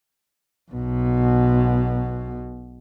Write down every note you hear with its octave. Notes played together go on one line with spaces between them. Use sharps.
B1 B2